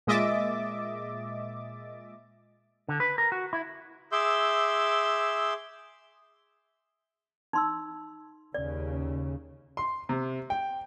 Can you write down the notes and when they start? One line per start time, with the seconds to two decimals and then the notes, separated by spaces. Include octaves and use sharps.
0.07 A#2 G#3 D#5 E5 D6 A6
2.89 D3
3.00 B4
3.18 A#4
3.32 F#4
3.53 E4
4.12 G#4 E5 C6 D6 E6 G6
7.53 D#4 C6 E6
8.54 D#2 C#3 D5
9.77 C6
10.09 C3
10.50 G5